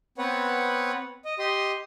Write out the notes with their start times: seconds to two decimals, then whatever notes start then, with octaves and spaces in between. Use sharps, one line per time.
0.18 B3 C4 B4 C#5 F#5
1.25 D#5
1.39 G4 D#5 C6